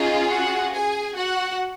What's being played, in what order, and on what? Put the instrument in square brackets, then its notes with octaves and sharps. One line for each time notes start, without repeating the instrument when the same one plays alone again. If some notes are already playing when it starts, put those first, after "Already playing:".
Already playing: [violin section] C#4 D#4 F4 G#4 D#5
F#4 F#5
G#4 G#5
F#4 F#5